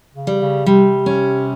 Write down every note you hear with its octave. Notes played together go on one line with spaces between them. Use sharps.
C#3
G3
C#3
C3 G3
C#4